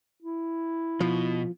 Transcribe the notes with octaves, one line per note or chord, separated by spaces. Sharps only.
E4
B2 F3